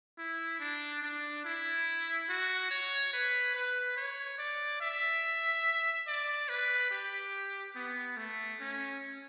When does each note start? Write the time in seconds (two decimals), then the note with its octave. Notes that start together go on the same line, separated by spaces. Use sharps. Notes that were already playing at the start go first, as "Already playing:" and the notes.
0.18 E4
0.60 D4
1.02 D4
1.44 E4
2.29 F#4
2.70 C#5
3.13 B4
3.54 B4
3.97 C#5
4.38 D5
4.81 E5
6.08 D5
6.49 B4
6.91 G4
7.76 B3
8.17 A3
8.60 C#4